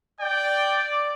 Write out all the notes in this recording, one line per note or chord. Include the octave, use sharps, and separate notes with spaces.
D5 G5